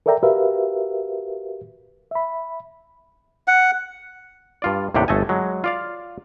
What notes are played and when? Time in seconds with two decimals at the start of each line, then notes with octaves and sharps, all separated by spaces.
0.06 A4 A#4 D5 E5 G5 A#5
0.23 F#4 G4 A#4 B4 E5 F5
2.11 E5 B5
3.48 F#5
4.62 G2 F4 D5
4.95 D#2 A2 C3 D4 G4 F#5
5.08 G1 A3 A4 D#5 G#5
5.29 F#3 G#3
5.64 F4 D5 F5